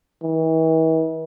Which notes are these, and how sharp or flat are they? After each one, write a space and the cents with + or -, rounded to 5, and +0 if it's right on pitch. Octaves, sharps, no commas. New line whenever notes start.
E3 -40